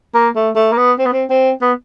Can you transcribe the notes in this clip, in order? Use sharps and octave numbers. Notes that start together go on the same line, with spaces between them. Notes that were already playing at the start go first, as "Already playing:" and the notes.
A#3
A3
A3
A#3
B3
C4
B3
C4
C4
B3